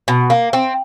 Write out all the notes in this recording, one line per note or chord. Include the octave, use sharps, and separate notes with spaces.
B2
A#3
C4